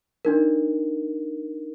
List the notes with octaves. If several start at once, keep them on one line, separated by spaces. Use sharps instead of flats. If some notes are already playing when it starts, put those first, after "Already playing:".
D4 D#4 A#4